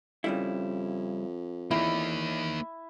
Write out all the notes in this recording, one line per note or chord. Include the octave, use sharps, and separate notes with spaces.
F2 C#3 G3 E4
E2 A#3 D#4 E4